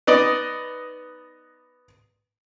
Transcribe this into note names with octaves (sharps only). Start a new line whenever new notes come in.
B3 D#4 D5 D#5